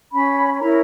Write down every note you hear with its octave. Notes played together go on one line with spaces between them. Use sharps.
C#4 B5
B5
E4 A#4 C#5 A#5